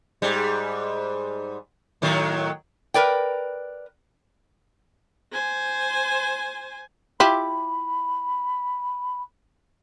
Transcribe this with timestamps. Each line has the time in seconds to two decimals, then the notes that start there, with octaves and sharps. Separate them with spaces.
0.22 G#2 G3
2.02 A2 D#3 F#3
2.94 A#4 B4 D5 G5
5.32 C5 G#5
7.20 E4 F4 G4 B5